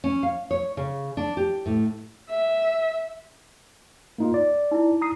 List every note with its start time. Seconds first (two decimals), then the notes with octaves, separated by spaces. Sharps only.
0.04 C#4
0.23 F5
0.51 C#5
0.77 C#3
1.17 D4
1.37 G4
1.66 A2
2.30 E5
4.18 A#3 D#4 F4
4.34 D5
4.71 D#4 E4
5.01 A#5 D#6 C7